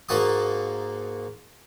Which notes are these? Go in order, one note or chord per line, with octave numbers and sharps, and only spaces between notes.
G#2 A#3 F#4 A5 D#6